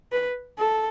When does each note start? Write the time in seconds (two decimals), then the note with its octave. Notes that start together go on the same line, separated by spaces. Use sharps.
0.12 B4
0.58 A4